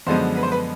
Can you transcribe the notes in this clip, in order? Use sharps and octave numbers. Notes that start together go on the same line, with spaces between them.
F#2 D3 F3 G#3 B3 C5
B4
C5
B4